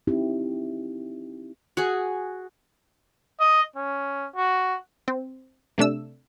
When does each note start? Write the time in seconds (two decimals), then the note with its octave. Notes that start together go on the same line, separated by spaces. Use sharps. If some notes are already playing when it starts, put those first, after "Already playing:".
0.07 C4 D#4 E4 G4
1.77 F#4 G#4
3.40 D#5
3.76 C#4
4.36 F#4
5.08 C4
5.78 C3 A3 D4 E6